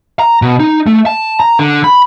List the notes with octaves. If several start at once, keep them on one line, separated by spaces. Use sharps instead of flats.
A#5
B2
D#4
A3
A5
A#5
D3
B5